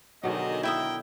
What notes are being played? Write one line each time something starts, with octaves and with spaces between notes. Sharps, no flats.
B2 D3 D#3 F#3 G4 G#4 D#5
E4 A#4 E5 G5 D#6